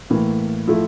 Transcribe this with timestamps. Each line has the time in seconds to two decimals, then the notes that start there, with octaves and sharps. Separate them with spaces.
0.10 A2 E3 A#3
0.68 A2 F3 A3 E4